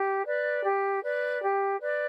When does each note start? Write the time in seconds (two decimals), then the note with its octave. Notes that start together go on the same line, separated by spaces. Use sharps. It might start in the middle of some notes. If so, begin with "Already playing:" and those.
Already playing: G4
0.26 B4 D5
0.64 G4
1.03 B4 D5
1.41 G4
1.80 B4 D5